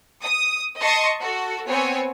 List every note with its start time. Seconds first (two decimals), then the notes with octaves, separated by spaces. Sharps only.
0.24 D#6
0.80 D#5 A5 C6 C#6 D#6
1.20 F#4 A4
1.69 B3 C4 C#5 G#5